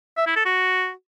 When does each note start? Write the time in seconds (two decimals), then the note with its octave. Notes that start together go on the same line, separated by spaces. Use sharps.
0.17 E5
0.27 E4
0.36 A4
0.46 F#4